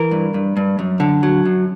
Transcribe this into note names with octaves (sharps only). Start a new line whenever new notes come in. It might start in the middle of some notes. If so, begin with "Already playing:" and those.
Already playing: E3 A#4
G2
G2
G2
F#2
D3
F#3
F#2